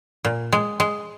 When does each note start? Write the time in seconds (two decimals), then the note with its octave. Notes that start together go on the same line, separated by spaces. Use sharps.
0.25 A#2
0.52 G#3
0.80 G#3